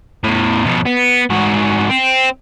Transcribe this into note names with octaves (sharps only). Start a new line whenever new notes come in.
E2 A2
F2 B2
B3
G#2 F#4
C4